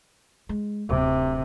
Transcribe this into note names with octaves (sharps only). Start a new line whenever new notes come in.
G#3
D1 C3